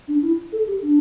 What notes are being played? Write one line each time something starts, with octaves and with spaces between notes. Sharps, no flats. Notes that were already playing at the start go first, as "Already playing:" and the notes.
D4
E4
A4
G4
D4